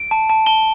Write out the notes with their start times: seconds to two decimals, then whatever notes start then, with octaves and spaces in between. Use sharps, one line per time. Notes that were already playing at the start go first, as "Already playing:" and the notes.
Already playing: D7
0.11 A5
0.30 A5
0.46 A5 G7